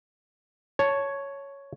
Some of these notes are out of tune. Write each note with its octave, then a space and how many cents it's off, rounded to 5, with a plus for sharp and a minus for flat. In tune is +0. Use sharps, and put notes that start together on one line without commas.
C#5 +0 A5 +0